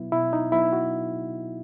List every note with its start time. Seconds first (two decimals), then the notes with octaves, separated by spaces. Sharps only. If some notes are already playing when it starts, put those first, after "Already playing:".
Already playing: B2 F#3 B3 E4
0.12 B2 E4
0.33 D#4
0.52 F#3 B3 E4
0.73 F#4